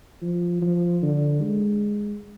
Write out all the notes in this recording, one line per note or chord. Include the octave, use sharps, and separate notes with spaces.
F3
F3
D3
G#3